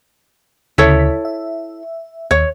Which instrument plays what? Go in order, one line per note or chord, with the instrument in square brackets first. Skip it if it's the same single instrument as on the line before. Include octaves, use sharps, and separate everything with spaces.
[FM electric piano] D2 C#3 B6 [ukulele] E4 A4 C#5
[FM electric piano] E5
[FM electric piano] D#2 [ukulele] C#5